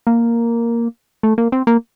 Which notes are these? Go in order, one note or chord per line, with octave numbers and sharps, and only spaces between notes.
A#3
A3
A#3
C4
A#3